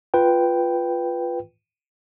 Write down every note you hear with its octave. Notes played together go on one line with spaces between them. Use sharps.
F4 B4 G5